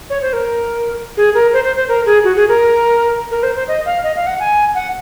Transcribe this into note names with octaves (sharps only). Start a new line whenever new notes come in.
C#5
C5
A#4
G#4
A#4
C5
C5
C5
A#4
G#4
F#4
G#4
A#4
A#4
C5
C5
D#5
F5
D#5
F5
F#5
G#5
F#5